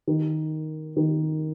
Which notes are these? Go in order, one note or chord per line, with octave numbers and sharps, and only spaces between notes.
D#3
D#3